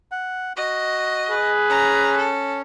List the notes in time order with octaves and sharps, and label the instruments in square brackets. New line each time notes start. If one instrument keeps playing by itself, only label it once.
[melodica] F#5
[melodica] F#4 [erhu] D#5
[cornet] G#4 [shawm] B4
[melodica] C#4 [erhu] A#5
[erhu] A4